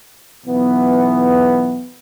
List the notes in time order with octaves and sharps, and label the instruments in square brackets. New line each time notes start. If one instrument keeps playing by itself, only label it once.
[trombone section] B1 E3 B3